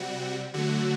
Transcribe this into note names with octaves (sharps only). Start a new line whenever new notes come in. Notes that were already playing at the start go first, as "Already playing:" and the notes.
Already playing: C3 G3 F#4
D3 F#3 A3 F#4